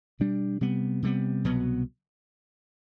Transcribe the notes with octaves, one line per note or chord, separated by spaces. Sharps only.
B2 G3 D4
C3 G3 B3
C3 G3 B3
C2 B2 F#3 B3